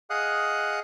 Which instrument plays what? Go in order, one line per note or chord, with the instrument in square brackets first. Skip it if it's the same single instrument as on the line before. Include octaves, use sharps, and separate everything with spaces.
[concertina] G#4 D#5 F5 F#5 D#6 F#6